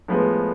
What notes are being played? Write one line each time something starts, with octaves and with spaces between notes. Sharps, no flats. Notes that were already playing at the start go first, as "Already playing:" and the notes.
A2 F3 G#3 B3